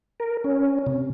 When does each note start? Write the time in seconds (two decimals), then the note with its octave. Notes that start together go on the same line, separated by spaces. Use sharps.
0.20 A#4
0.44 C#4
0.86 C3